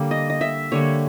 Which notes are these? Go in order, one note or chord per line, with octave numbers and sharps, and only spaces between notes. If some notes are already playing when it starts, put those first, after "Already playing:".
Already playing: D3 G3 A#3
D#5
D#5
E5
D3 G3 A#3 C#5